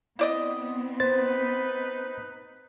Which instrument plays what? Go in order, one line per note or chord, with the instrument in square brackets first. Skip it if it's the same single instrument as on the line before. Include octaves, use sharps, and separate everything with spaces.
[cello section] B3 C4 [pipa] E4 D5 D#5
[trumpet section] D#4 B4 [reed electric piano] C5 A6